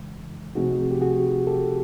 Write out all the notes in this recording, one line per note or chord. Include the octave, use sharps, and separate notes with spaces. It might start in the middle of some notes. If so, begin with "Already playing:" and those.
Already playing: F2 C#3 E3 G#3
C3 F3 A3 C4 D#4 F#4 G#4
G4
F#4 G#4
G4 A4